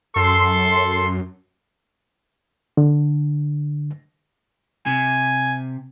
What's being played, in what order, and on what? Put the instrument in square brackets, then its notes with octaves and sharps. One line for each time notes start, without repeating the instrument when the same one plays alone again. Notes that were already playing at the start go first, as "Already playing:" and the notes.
[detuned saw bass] F#2 [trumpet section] A4 C6
[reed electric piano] D3
[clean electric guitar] C3 [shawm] G#5